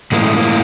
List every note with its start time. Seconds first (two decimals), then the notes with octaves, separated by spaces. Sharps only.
0.12 A2 E3 G#3 A#3
0.24 A3
0.37 A#3